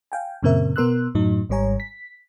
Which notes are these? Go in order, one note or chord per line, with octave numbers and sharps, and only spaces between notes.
F5 G5 G#5
F#2 A#2 C#3 C4 A#4 E5
B2 B3 A#4 C6 E6 F#6
F#2 A2 F#3 D#4
G#1 G#2 G3 C#5 G#5 A#5
B6